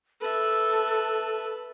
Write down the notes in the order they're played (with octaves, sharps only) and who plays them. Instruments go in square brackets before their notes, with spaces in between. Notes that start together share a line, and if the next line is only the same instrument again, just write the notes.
[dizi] A4 [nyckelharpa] B4 E5